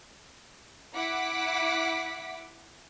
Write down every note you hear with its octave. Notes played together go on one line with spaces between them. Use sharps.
E4 F#5 D6 B6